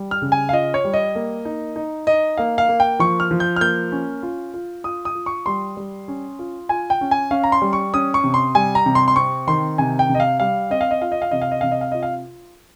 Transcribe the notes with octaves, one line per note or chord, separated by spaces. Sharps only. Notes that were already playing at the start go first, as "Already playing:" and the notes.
Already playing: G3
F6
C#3
G#5
F5
F4 D#5
C#5
G3
D#5
A#3
D#4
D#4
D#4 D#5
A#3 F5
F5
A#3
G5
F3 C#6
F6
F3
G6
F6
A#3 G6
C#4
F4
F4
F4 D#6
D#6
F4
C#6
G3 C6
G3
C#4
F4
F4 G#5
G5
C#4
G#5
C#4 F5
A#5
C6
G3
C#6
C#4 D#6
C#6
C3
C6
G3 G#5
A#5
C3
C6
C6
C4 C#6
D#3 C6
C3 G#5
G5
C3
D#5
F5
G3 F5
C4 D#5
F5
D#5
F4 F5
D#5
F5
C3 D#5
F5
D#5
C3 F5
D#5
F5
F4 D#5
F5